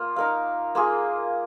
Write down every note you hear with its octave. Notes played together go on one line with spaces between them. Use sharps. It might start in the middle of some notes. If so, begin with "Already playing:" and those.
Already playing: A#3 F4
D#4 A#4 F5
A#3 F4 G#4